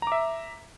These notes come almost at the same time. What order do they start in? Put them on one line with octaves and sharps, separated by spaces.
A#5 D6 E5